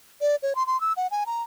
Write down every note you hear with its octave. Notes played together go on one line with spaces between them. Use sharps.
D5
C#5
C6
C6
E6
F#5
G#5
A#5